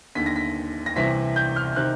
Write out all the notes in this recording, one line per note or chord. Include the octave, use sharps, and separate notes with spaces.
D#2 D3 B6
A#6
B6
A#6
C2 C3 E3 B6
G6
F6
C3 D#3 F#6